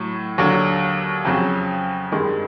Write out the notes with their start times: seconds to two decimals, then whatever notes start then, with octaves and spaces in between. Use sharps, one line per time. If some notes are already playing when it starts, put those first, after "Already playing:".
Already playing: A2 F#3
0.38 D#2 D3 F#3
1.25 F2 C#3 F#3
2.12 G2 D#3 G#3